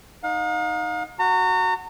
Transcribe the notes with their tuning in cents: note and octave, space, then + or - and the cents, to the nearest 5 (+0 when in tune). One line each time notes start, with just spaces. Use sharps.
D#4 +0 F5 +40
F#4 +0 A#5 -35